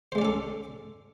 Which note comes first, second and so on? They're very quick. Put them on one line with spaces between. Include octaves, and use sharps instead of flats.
C5 G#3 D5 C#4 A4